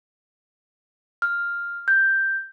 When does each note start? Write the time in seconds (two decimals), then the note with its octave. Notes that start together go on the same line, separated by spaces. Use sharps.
1.22 F6
1.88 G6